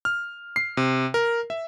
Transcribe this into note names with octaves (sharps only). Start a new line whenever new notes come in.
F6
C7
C3
A#4
E5